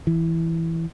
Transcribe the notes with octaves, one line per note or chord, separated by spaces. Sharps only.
E3